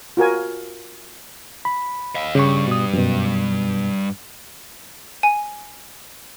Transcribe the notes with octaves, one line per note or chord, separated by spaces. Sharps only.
F4 F#4 A#4 G#5
B5
D#5 F5
G2 C#3 C#6
B2 D#6
F#2 B2
G#5